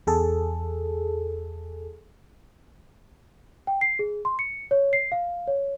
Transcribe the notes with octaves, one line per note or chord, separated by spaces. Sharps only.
E2 G#4 A4
G5
C7
G#4
C6
C#7
C#5
C7
F5
C#5